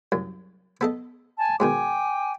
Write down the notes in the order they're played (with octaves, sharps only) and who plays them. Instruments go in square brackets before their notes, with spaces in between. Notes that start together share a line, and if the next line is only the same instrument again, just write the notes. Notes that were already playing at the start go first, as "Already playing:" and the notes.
[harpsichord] C2 F#2
B3 A4 D#5
[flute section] G#5 A5
[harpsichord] G#2 B2 D#3 [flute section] G5 G#5 D6